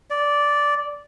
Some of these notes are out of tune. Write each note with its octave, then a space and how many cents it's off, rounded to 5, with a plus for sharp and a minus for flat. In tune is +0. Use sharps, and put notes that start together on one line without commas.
D5 -10